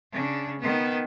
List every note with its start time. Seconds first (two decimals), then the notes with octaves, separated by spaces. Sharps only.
0.12 C#3 D4
0.59 D#3 B3